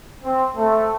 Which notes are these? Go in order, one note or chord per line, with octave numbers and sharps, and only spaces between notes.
C4
A3